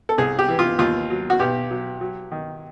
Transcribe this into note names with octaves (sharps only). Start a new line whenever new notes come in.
A4
C2 G#4
G4
E3
F4
D#2 F4
F#3
F#4
B1 G4
F#3
F#3
D#3